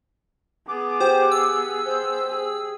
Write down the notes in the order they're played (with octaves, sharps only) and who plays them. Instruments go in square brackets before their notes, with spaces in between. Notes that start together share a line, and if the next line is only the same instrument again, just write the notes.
[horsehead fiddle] B3 G#4 [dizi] D6
[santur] G4 [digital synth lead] C5
[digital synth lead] E6
[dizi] C5
[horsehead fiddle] G#4